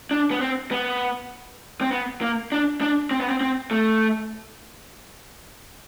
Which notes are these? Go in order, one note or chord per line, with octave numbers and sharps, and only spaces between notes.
D4
B3
C4
B3
C4
B3
A#3
D4
D4
C4
B3
C4
C4
A3